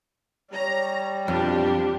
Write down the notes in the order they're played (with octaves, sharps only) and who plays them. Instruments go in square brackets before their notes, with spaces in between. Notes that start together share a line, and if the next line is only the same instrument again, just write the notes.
[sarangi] G3 [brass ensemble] C#5 [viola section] A#5
[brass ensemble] C2 B2 [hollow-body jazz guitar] F2 [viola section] F3 D4 G4